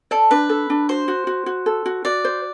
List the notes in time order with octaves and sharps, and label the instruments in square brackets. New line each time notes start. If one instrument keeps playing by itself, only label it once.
[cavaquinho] A4 [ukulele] D5
[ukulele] D4 [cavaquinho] B4
[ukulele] A4
D4
[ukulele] F#4 [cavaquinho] C5
[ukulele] F#4
F#4
F#4
A4
F#4
[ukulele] F#4 [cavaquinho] D5
[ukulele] C5